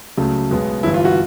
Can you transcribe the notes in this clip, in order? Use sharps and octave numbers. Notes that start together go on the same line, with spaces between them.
C#2 C#3 F#3 A3
B1 B2 G#3 B3
G1 G2 E3 E4
F4
F#4